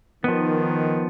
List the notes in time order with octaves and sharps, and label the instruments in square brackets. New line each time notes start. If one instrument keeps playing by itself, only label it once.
[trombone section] D#3 [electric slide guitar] F3 B3